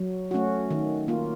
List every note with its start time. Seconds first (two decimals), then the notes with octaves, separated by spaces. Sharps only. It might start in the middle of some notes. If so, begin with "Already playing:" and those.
Already playing: F#3
0.31 A3 C#4 F#4
0.71 D#3
1.08 A#3 F4